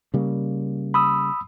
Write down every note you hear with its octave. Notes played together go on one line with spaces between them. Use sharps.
C#3 G3 A#3
B5 D#6 E6